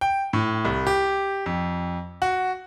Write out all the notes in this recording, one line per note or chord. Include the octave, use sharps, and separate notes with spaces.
G5
A2
C2
G4
F2
F#4